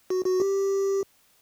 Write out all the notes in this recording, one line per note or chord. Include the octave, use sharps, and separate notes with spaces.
F#4
F#4
G4